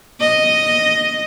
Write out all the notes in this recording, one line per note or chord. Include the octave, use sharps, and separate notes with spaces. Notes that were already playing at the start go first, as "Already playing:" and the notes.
D#5